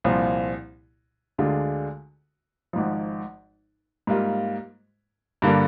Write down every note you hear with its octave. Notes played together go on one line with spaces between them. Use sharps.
C2 A#2 F3 C4 F4
D2 D3 G#3 D4 F4
G#1 G#2 F3
G#2 G3 A#3 F4
G2 D3 G3 A#3 D4